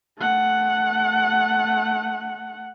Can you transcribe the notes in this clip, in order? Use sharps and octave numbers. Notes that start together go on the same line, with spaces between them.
A3 F#5